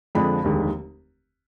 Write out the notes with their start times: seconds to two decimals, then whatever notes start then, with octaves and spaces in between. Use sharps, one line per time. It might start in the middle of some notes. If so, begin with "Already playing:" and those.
0.15 F2 D3 F3 G#3 D4 B5
0.44 F1 D#2 D3 G#3